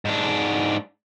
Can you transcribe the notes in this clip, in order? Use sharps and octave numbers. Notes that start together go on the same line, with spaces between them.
G#2 D4